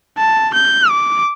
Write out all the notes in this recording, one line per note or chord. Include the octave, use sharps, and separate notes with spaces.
A5
G6
D6